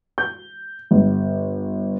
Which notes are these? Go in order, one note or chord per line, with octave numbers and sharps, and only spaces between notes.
G6
G1